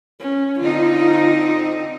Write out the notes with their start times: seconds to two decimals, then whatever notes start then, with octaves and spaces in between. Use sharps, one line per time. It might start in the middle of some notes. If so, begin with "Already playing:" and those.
0.20 C#4
0.59 D3 C4 D#4 F4